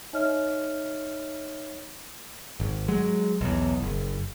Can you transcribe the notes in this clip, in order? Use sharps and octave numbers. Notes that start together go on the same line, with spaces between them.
D#4 C#5 D#5 E5 F6
G#1
F#3 G#3
B1 E2
F#1